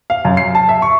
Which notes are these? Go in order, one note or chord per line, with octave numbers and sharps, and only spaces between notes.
F5
F#2
C7
A5
E5
C#6